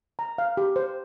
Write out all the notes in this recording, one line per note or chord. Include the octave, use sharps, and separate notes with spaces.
A#5
F5
G4
C5